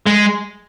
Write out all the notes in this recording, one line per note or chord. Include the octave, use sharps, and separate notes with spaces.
G#3